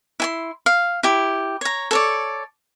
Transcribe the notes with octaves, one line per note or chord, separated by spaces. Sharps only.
E4 G#5 C6
F5
E4 G4
C#5 A#5
A4 C#5 D5